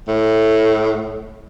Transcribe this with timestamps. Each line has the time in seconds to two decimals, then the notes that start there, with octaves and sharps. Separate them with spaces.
0.08 A2